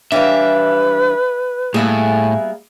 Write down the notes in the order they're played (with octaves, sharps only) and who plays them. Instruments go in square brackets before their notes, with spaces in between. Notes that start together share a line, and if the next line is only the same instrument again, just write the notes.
[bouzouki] E3 G3 [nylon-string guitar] D4 C#5 F5 [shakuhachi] B4 [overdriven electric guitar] E5
[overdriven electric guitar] A2 [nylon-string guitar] G3 A#3 [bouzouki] B3 E4 G#4